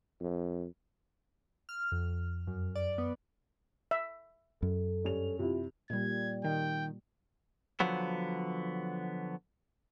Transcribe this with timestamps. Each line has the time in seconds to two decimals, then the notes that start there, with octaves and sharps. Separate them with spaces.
0.20 F2
1.69 F6
1.92 F2
2.47 F#2
2.76 D5
2.98 B3
3.91 E5
4.62 F#2 A4
5.04 G2 C#4 F7
5.39 C3 E4 F4
5.90 A#2 G3 G#6
6.44 D#3 G5
7.80 D3 F3 F#3 B3